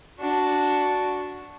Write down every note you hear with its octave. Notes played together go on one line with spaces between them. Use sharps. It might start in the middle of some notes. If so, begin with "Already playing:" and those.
D4 F#4